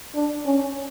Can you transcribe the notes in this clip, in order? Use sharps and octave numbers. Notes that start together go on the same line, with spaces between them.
D4
C#4